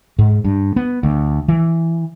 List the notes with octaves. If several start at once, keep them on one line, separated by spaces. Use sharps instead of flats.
G#2
G2
B3
D2
E3